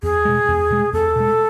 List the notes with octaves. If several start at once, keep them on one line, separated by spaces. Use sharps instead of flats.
E2 G#4
B2 G#3
E2
B2 G#3
E2 A4
B2 G#3